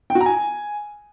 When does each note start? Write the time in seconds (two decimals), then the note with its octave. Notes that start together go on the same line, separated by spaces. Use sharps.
0.10 G5
0.15 F#4
0.21 A#5
0.26 G#5